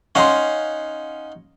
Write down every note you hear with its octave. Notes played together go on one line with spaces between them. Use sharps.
C#4 D#4 F5 F#5 C6